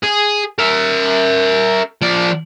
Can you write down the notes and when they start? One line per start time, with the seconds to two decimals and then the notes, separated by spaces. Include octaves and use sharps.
0.04 G#4
0.59 A#4 E5
2.02 F3 D5